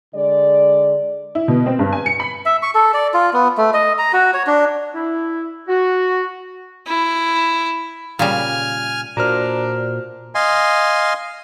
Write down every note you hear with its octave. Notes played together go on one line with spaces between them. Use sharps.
D3 G#3 D5
E4
B2
C4
G2
G#5
C#7
B5
E5
C#6
A4
D5
F4
B3
A3
D#5
A#5
F#4
C#5
D4
E4
F#4
E4
A#2 C#3 G3 G#5 F6
A#2 D4 F#4 A#4 C5 A#5 F6
D#5 F5 G#5 C6